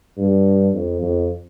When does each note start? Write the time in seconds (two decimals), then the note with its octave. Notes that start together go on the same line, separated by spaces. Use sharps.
0.18 G2
0.74 F2
1.02 F2